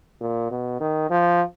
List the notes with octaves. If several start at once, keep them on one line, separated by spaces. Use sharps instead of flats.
A#2
B2
D#3
F3